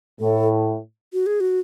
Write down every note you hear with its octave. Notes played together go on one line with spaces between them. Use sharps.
A2 A4
F#4
G#4
F#4